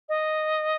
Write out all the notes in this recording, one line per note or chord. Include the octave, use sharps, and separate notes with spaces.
D#5